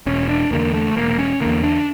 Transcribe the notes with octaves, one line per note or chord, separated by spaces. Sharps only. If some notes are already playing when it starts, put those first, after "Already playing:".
E1 C#4
D4
E2 D3 A#3
A3
E1 A#3
A#3
C#4
E2 D3 A#3
D4